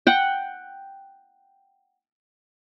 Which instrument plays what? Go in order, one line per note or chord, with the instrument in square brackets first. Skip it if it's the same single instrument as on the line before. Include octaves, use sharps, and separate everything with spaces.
[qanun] F#5 G5